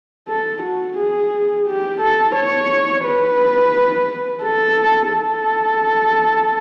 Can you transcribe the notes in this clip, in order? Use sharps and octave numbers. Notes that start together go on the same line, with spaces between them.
A4
F#4
G#4
G4
A4
C#5
B4
A4
A4